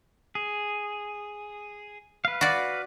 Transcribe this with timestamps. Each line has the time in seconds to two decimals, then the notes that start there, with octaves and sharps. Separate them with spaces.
0.35 G#4
2.25 B4 F5
2.41 F#4 D5